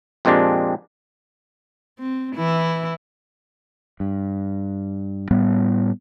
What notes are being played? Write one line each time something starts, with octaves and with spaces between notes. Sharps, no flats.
F2 A#2 G#3 C4 D4 G4
C4
E3 E4
G2
A2 G3 B3